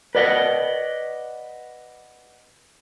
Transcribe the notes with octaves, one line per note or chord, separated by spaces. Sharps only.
B4 D5 D#5 F#5